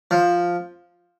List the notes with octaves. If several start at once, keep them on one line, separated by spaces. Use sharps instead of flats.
F3